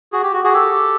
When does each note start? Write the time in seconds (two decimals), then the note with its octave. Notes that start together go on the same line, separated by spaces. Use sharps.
0.13 F#4 G#4
0.23 G4
0.34 F#4
0.44 F#4 G#4
0.53 G4 A4